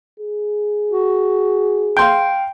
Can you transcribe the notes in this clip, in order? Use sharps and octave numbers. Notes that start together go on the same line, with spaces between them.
G#4
F#4
F5 G5 C6 G6